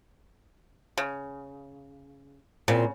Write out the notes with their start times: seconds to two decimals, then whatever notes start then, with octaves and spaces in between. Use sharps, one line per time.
0.98 C#3
2.68 A#2 C#3 C4